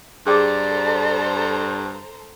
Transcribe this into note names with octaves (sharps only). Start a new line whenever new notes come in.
G2 G#4 A4 C5 D5 G5 A#5 D6